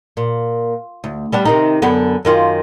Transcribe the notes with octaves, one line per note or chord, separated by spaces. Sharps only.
A#2
D2
G3 B3 D4
C3 D#3 D#4
F#2 D3 B3
F#2 D#3 F4